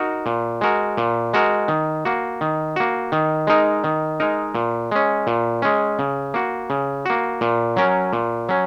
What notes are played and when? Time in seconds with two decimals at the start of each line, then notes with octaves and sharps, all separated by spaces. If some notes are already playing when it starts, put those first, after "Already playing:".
Already playing: D#4 F#4 A#4
0.26 A#2
0.61 G#3 F#4 A#4
0.97 A#2
1.33 G#3 F#4 A#4
1.68 D#3
2.05 A#3 F#4
2.41 D#3
2.76 A#3 F#4
3.12 D#3
3.47 G#3 D#4 A#4
3.84 D#3
4.20 G#3 D#4 A#4
4.55 A#2
4.91 G#3 C#4
5.27 A#2
5.62 G#3 C#4
5.99 C#3
6.34 A#3 F#4
6.70 C#3
7.05 A#3 F#4
7.41 A#2
7.76 F#3 C#4 A#4
8.13 A#2
8.49 F#3 C#4